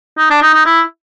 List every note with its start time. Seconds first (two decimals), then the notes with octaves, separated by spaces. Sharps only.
0.18 D#4
0.30 D4
0.42 D#4
0.54 D#4
0.66 E4